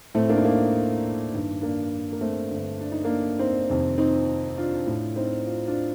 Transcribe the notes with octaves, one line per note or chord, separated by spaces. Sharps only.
A2 A3 C4
A#3 D4
D#4
A#3 D4
G2 D#3
A#3 D4
A#3
A3 C4
G2 D3
D4
D#4
A#3 D4
C4 D#4
F2 C3 D#3
C4 D#4
D4 F4
A2
C4 D#4
F4
D4 F4